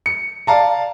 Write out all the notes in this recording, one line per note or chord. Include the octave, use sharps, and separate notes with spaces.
C#7
D5 F5 A5 A#5